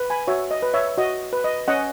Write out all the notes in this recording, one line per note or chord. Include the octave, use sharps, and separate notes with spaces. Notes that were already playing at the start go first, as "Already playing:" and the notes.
Already playing: B4
G#5 B5
F#4 C#5 E5
D#5
B4
C#5 E5
F#4 D#5
B4
D#5
C#4 D#5 F#5